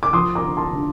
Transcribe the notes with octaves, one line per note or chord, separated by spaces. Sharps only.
D6
F3 C6 D#6
A#5 D6
D3
A5 C6
D3